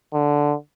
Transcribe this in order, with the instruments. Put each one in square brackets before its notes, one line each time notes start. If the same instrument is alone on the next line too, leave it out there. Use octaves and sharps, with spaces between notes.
[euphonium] D3